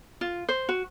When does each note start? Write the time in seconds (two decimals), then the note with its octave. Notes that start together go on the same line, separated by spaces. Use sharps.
0.21 F4
0.49 C5
0.69 F#4